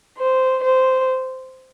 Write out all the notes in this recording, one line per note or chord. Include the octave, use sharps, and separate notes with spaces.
C5
C5